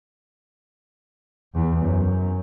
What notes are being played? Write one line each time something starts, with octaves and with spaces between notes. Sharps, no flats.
E2
F#2